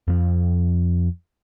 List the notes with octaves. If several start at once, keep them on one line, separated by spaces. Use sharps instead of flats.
F2 F3